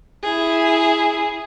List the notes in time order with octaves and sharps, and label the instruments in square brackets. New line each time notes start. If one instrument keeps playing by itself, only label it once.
[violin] E4 G#4